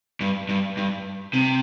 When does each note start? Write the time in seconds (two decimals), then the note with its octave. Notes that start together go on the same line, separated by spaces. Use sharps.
0.20 G2
0.49 G2
0.77 G2
1.33 C3